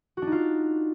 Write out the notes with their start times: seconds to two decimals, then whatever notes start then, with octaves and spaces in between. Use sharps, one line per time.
0.17 F#4
0.22 D4
0.27 D#4
0.32 F4